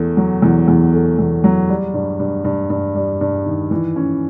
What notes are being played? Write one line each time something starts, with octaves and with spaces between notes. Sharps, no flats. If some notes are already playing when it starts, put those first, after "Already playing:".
Already playing: E2 A3
F#3
E2
E2
A3
E2
F#3
G3
G2
G2
G2
G2
G3
G2
D#3
E3
C#4